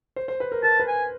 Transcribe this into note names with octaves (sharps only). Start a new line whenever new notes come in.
C5
C5
B4
A#4
A#4 A5
B4
G#5